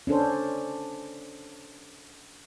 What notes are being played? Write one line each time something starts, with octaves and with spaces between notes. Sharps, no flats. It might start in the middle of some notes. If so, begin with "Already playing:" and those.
C#4 D4 A4 C5